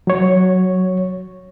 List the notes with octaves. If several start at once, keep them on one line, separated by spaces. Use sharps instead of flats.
F#3 C#5